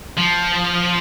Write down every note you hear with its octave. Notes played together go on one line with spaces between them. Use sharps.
F3